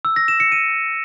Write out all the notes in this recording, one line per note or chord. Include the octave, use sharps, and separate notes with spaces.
E6
A#6
E7
C#7
D#7